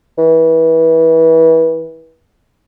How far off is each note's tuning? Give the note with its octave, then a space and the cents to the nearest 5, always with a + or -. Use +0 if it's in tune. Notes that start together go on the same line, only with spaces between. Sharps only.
E3 -30